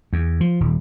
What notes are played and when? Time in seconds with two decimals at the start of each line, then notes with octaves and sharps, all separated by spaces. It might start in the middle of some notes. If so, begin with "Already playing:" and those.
0.13 E2
0.41 F3
0.60 D#1